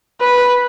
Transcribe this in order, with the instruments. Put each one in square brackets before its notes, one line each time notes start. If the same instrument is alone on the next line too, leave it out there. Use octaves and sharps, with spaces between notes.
[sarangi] B4